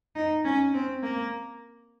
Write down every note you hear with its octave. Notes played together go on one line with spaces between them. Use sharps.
D#4
C#4
C4
A#3